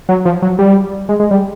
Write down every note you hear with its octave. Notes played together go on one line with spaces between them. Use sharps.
F#3
F3
F#3
G3
G#3
G#3
G3